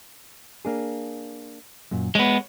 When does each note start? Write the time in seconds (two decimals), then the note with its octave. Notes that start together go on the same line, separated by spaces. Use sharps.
0.65 A#3 D4 G#4
1.91 F#2 A#2
2.15 G#3 B3 C#5